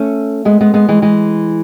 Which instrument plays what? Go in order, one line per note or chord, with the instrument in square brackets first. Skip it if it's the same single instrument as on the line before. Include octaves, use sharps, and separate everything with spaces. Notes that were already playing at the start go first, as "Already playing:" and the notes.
Already playing: [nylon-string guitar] A3 C#4
G#3 B3
G#3 B3
G#3 B3
E3 G#3
E3 G#3